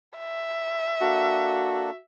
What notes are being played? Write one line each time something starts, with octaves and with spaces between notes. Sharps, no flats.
E5
A#3 D4 F#4 A4